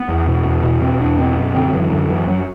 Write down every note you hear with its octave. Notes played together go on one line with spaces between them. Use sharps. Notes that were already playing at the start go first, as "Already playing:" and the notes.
Already playing: B3
E2
B2
E2
B2
B2 C4
E2 D4
B2 C4
F#2 B3
D3 C4
F#2 E3
F#2 D3
F#2 E3
F#2 F#3